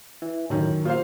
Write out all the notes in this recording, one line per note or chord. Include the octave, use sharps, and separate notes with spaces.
E3
F#2 A2 D#3
A#2 F4 C5 F5